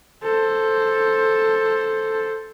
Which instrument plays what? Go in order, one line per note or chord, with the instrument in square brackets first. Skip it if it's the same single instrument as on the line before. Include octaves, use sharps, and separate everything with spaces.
[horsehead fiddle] A4 C5